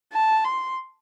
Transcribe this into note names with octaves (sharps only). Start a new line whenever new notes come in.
A5
C6